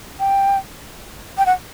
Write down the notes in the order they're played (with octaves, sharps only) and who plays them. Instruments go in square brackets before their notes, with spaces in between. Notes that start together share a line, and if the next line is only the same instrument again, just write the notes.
[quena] G5
G5
F#5